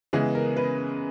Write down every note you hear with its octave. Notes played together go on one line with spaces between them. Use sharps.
C#3 E3 G#3 B3 G#4
A#4
B4